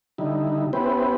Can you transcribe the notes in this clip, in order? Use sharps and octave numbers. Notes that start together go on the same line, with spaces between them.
D3 G3 D#4 E4
B3 C#4 E4 G4 B4 C5